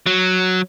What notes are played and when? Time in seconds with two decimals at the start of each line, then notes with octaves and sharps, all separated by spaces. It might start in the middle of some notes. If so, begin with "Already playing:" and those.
0.06 F#3